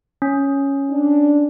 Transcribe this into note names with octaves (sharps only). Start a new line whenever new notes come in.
C#4
D4